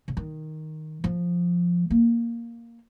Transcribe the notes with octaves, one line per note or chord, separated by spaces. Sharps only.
C#3
D#3
F3
A#3